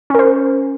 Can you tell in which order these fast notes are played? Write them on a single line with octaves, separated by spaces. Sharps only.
C#4 A#4 C5